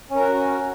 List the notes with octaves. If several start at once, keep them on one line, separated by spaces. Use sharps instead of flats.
C#4 F#4 A#4